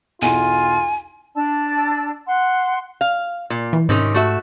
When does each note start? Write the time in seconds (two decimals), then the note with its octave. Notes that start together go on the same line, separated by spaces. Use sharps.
0.22 B1 E2 F4 G#5 C6
1.35 D4 D5 A5 E6
2.26 F#5 C6
3.01 F5
3.50 A#2
3.73 E3
3.89 G#2 C3 D#3 C#4
4.14 A3 F#4 E5